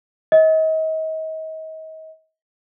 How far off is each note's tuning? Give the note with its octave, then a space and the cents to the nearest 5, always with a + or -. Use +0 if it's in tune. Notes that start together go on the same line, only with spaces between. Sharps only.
D#5 +35